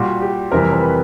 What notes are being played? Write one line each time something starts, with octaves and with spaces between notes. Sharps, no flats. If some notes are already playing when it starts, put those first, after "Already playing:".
Already playing: A#2 G3 F#4
G4
F2 C3 E3 G3 A#4
A#4
B4